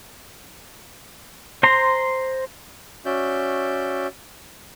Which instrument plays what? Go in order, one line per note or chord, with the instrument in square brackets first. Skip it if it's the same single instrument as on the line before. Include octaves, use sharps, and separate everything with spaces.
[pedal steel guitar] C5 A#5 C6
[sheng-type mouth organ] C#4 F#4 D5 E5 G6